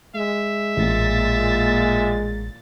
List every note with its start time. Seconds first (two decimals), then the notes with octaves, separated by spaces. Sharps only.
0.15 G#3 E5
0.77 A1 A#2 A6